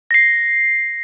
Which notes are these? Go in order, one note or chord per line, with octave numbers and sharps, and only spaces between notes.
A#6 C7